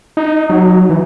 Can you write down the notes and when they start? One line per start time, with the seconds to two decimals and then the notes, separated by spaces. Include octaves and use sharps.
0.17 D#4
0.50 F#3
0.90 E3